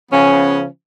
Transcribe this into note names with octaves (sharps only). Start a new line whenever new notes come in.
C#3 F3 B3 C#4